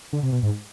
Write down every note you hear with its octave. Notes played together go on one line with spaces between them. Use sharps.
D3
C3
B2
G#2